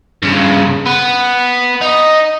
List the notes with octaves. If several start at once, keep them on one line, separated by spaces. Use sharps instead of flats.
G2 C#3
B3
D#4